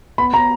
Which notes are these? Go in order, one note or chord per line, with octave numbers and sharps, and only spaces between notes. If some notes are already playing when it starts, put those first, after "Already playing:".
B3 B5
B3 A#5